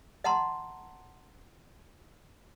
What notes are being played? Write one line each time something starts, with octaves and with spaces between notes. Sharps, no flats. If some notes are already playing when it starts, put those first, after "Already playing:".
D#5 F#5 A5 A#5 C6